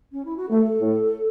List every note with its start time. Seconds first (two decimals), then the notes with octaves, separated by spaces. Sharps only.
0.12 C#4
0.25 E4
0.37 F#4
0.50 A3 A4
0.81 A2